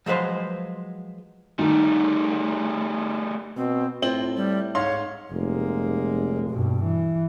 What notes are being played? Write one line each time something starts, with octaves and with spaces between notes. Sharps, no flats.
F3 F#3 G#3 B4 C5
D#3 G3 A3
B2 C4
A2 C4 F4 F#7
G3
G#2 C#5 F5 C6
F1 G#3 A#3
G2 B2
E3